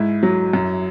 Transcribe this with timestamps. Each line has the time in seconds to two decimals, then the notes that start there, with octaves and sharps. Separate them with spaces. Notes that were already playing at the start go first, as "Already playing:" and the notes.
Already playing: G#2 E4
0.23 F#3
0.53 F#2